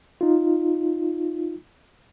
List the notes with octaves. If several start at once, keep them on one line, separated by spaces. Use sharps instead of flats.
D#4 F4